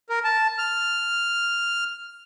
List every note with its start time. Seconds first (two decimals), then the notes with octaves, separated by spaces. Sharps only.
0.09 A#4
0.24 A5
0.58 F6